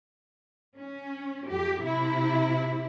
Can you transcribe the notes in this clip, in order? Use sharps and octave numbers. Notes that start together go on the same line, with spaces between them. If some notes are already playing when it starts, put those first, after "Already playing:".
C#4
F2 G4
C3 E4